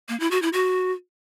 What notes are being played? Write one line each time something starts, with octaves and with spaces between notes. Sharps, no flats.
A#3
E4
F#4
E4
F#4